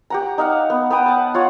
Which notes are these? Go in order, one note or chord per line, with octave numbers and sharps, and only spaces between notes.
G4 F#5 A#5
D#4 F5 F#5
B3
B3 B4 G5 D#6
F#5 A5
F4 C#5 F#5